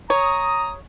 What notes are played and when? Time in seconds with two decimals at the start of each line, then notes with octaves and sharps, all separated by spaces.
0.10 C#5 A#5 D#6